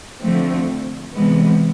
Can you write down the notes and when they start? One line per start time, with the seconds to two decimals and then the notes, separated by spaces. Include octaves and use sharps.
0.21 D3 F3 A3 C4
1.14 C3 E3 G#3 B3